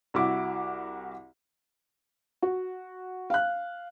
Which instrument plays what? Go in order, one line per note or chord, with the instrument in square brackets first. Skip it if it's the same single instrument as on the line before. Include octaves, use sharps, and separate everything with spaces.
[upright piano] C2 E4 F#4 D6
[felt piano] F#4
F5 F#6